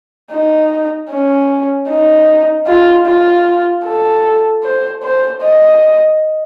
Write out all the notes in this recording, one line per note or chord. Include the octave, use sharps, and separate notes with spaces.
D#4
C#4
D#4
F4
F4
A4
C5
C5
D#5